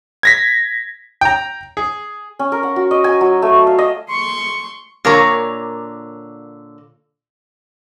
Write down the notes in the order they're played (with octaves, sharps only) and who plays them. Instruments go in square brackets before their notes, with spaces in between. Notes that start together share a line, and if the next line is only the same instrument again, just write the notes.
[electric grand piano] G#6 A#6 B6
[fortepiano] G5 A#5
G#4
[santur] C#4
A#4
F#5
F#4
D#5
G#5
F#3
A3
A5
F5
D#5
[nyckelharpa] C6 C#6
[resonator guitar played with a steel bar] A#2 D3 A#4 C#5 A#5